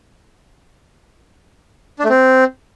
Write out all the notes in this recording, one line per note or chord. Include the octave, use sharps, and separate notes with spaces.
D4
A3
C4